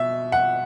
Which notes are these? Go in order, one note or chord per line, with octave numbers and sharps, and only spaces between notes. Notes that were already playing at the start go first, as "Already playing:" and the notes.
Already playing: B2 E5
F#5